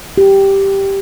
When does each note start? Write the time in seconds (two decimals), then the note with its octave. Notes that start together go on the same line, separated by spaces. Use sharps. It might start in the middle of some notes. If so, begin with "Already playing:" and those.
0.18 G4